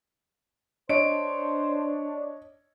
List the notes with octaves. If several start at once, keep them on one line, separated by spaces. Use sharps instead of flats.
D4 C5 C#5 D#5 D7